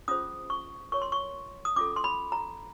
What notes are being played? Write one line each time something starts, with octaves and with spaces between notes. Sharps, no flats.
C#4 F4 G#4 C5 D#6
C#6
F4 A#4 C#5 C#6
C6
C#6
D#6
C#4 F4 A4 D6
C6
B5
A#5